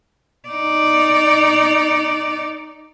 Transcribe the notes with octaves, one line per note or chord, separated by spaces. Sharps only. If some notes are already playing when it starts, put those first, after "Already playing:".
D#4 D5